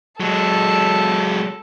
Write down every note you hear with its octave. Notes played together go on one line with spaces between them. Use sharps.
F#3 G#3 A4